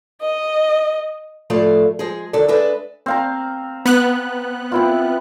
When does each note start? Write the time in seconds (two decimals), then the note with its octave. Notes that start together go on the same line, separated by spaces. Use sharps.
0.22 D#5
1.50 A2 F3 A3 D5 F5
1.99 F3 G#3 G#4
2.33 D#2 D3 D#3 A4 D5
2.48 G#3 D4 A4 B4 D5 E5
3.06 C4 F5 A#5
3.86 B3 F#6
4.72 C4 E4 F4